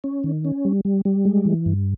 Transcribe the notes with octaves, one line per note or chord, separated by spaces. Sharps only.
C#4
D#3
C#4
G3
G3
G3
G#3
E3
G2